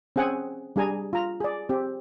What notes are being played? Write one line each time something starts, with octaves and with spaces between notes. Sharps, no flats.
C4 C#4 G#4 F#5 G#5
G3 D4 G#4 G#5 A#5
F4 A#5
G#4 D5
C4 G4